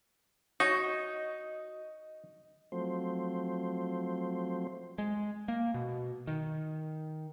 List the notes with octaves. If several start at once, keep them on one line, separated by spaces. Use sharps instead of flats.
D#4 F#4 C#5 D#5
F3 F#3 A3 C4 C5
G#3
A#3
B2
D#3